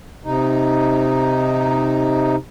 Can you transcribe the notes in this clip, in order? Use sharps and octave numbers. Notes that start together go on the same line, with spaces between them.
C3 D#4